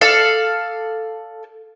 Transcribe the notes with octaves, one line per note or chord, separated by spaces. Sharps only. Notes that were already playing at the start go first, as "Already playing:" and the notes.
A4 D5 F5